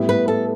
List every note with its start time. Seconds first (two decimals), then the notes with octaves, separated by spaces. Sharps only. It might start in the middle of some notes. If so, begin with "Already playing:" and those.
Already playing: A2 G3 B3 E4
0.09 B4
0.28 A4